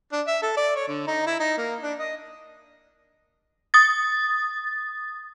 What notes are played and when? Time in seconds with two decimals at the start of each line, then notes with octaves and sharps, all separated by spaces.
0.13 D4
0.27 E5
0.42 A4
0.57 D5
0.76 C#5
0.88 D3
1.07 D#4
1.27 E4
1.40 D#4
1.58 A#3
1.83 D4
1.99 D#5
3.74 D#6 A6